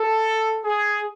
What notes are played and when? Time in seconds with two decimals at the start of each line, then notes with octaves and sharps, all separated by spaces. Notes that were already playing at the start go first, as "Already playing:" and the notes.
Already playing: A4
0.65 G#4